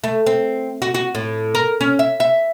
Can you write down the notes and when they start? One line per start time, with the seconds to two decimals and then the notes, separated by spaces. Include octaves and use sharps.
0.04 A3
0.26 C4
0.82 F#4
0.94 F#4
1.15 A2
1.55 A#4
1.81 C#4
1.99 E5
2.20 E5